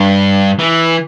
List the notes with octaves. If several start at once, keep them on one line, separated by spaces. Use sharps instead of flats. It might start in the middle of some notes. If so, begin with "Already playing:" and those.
Already playing: G2
E3